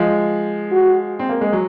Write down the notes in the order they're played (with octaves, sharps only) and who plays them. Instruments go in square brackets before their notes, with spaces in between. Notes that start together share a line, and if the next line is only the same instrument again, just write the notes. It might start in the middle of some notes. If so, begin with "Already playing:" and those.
Already playing: [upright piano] F3 G#3
[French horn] F#4
[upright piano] C4
A#3
G#3
F#3